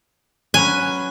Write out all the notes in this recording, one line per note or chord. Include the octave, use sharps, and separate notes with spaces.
F#3 C#4 B4 G#5